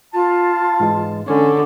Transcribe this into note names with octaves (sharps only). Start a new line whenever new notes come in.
F4 A5
G#2 E3 G#3
D3 C#4 C#5